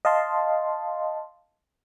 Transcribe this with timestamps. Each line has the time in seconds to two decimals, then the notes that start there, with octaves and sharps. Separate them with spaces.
0.05 D#5 F5 A5 C6